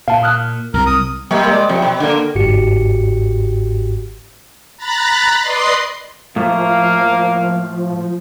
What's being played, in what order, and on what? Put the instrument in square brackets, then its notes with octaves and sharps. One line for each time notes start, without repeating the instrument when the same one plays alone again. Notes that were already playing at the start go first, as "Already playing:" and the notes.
[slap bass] A#2 [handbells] F5 A5
[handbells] D#6 F6 F#6
[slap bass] C2 [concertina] A#4
[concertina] D#6
[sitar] C3 G3 A#3
G#3 D5
F2 C3
B2
D3 A#3
[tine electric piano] G1 G#2 F#4 G4 C#7
[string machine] A#5 B5 F#6 A6
B4 D5 D#5 C6 C7
[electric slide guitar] A2 [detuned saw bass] F3 [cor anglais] A#3 [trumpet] F5